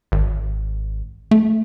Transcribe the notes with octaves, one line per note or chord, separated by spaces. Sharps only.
G#1
A3